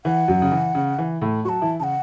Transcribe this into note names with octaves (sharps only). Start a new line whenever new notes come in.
E3 F#5
F#2 F#3
C#3
E3
C#3
E3
A2 A3
F#3 F#4 A5 C#6
E3 E4
C#3 F#5 A5